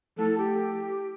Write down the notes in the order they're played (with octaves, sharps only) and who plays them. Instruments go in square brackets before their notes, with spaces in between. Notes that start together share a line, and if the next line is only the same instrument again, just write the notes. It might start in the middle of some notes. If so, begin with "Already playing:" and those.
[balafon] F3 A3 E4 [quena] A4
[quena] G4